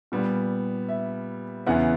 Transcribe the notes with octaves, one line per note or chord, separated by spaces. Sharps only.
A#2 G3 B3
E5
E2 C#3 E3 B3 F#5